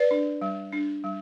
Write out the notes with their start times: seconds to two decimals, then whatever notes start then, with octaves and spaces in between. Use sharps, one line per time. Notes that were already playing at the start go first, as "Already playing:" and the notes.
Already playing: B4 D5
0.11 D4
0.41 G3
0.72 D4
1.04 G3